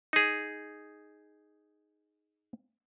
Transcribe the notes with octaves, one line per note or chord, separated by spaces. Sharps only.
D#4 G#4